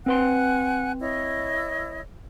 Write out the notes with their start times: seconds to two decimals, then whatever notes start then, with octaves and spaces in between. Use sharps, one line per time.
0.06 C4 B4 F#5 G#5 C6 F#6
1.00 E4 C#5 D#5